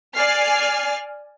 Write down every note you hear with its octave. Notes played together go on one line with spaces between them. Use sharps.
D5 G#5 F6 C7